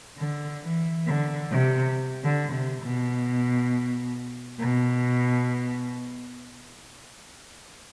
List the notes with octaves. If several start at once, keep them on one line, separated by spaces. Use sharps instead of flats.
D3
E3
D3
C3
D3
C3
B2
B2